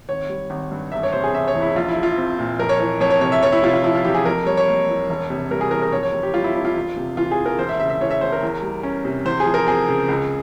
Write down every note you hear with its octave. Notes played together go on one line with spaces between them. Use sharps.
G#1 C#5
G3
G#1
G2
E1 E5
C#5
C3 C5
G#4
E1 E5
C#5
E2
E4
A#1 F4
E4
F3
F4
C4
A#2
F2 A#4
C#5
E3 C#5
F2 C#5
C#5
C3 C#5
E5
F1 C#5
E4
C3 F4
F4
F3 E4
F4
E2 G4
G#4
F2 A#4
G3 C#5
C#5
A#3
E3
E1
C3
G3 A#4
G#4
E2 A#4
A#4
F1 C#5
C#5
C3
G4
G3 F4
E4
F2 E4
F4
E1
C3
E3 F4
G#4
E2
A#4
E1 C5
E5
C#3 E5
E5
E3 C#5
E5
E2 C5
A#4
E2
G3
C#4
C3
E2 C5
G#4
F3
A#4
C4 G#4
C#3
C#2